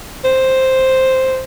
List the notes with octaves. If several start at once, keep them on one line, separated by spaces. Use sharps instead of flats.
C5